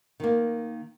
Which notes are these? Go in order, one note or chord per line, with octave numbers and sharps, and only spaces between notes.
D#3 A#3